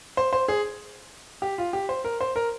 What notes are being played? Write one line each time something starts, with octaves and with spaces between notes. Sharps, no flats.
C5
C5
G#4
G4
F4
G4
C5
A#4
C5
A#4